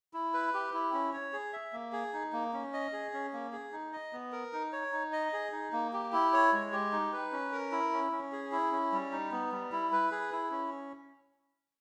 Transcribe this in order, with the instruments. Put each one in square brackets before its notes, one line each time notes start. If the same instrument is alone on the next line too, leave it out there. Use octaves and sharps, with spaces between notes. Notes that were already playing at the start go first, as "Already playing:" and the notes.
[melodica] E4
B4
G4
E4
C#4
C#5
G#4
E5
A#3
G#4
D#4
A#3
C#4
D#5
G#4
C#4
A#3
G#4
D#4
D#5
B3
A#4
D#4
C#5
D#4
D#5
G#4
D#4
A#3
G4
E4
C#5
G#3
G4
D#4
B4
C#4
A#4
E4
C#4
C#4
G#4
E4
C#4
G3
D#4
B3
G3
E4
B4
G#4
E4
C#4